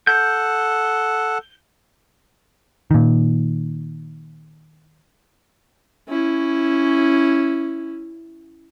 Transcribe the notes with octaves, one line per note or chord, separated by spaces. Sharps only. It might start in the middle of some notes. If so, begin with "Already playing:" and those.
A4 F#5 G6
A#2 D#3
C#4 E4